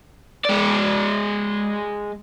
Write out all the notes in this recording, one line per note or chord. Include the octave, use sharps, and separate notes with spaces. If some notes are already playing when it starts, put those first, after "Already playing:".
G#3 D5